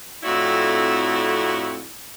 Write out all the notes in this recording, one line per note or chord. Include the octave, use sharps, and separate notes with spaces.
F2 A2 C4 D4 E4 F#4